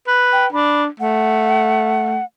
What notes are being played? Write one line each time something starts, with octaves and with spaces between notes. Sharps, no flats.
B4
G5
D4 B5
A3 F#5